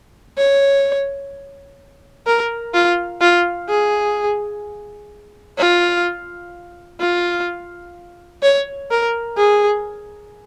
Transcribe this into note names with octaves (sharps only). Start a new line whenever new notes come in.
C#5
A#4
F4
F4
G#4
F4
F4
C#5
A#4
G#4